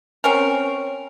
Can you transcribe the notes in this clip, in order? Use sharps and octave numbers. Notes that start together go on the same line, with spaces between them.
C4 C#4 A#4